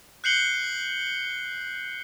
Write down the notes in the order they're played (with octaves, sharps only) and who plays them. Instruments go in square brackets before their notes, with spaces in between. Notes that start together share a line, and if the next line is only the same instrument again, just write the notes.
[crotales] F#6 G6 C7 C#7 F#7 G7